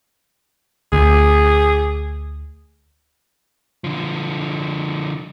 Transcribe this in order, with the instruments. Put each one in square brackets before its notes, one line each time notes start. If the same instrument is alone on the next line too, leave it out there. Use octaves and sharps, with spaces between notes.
[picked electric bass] D2 [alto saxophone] G#4
[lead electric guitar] D3 F3